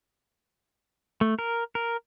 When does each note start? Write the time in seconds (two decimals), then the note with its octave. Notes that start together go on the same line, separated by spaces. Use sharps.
1.21 A3
1.39 A#4
1.75 A#4